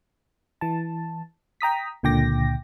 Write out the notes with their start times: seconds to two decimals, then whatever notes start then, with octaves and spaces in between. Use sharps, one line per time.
0.61 E3 A5
1.61 G5 A#5 D#6 B6
2.03 C#2 A#2 D3 G5 D6 A#6